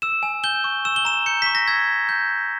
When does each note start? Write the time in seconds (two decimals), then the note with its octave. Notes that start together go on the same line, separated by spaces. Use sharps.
0.02 E6 E7
0.23 G#5
0.44 G6 G7
0.64 C#6
0.85 E6 E7
0.96 G7
1.05 A#5 E7
1.26 G6 C#7
1.42 C#6 B6
1.55 A#6
1.68 E6 G#6
1.88 A#5
2.09 G6